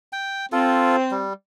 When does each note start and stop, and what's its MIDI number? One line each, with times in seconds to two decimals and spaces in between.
0.13 0.46 79
0.52 1.22 60
0.52 0.96 65
0.52 0.96 69
1.11 1.33 55